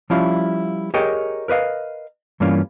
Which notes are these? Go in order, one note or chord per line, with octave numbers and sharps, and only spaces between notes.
F3 G3 C#4 E4 F4 F5
G4 G#4 A#4 C#5 D#5 G5
A#4 B4 D#5 F5
G2 E3 G3 A#3 C#4 F4